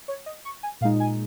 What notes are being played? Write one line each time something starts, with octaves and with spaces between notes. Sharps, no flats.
C#5
D#5
C#6
G#5
A#2 G#3 D#4 F5
G#5